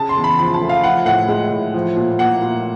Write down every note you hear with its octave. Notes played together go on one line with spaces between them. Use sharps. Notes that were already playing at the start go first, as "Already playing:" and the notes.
Already playing: C#3 A5
C6
E2
B5
F3 B5
A5
A3
F5
F3 F#5
A2 F#5
G#3
A2
F3
A#2
A#3 F#5
A#2